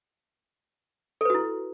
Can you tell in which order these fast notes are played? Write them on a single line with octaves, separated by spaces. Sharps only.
A4 B4 F#4 E4